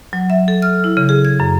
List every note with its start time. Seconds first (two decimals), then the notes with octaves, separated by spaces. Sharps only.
0.13 F#3
0.30 E5
0.48 A4
0.62 F6
0.84 E4
0.97 C#3
1.09 G#4
1.25 G#6
1.40 F#2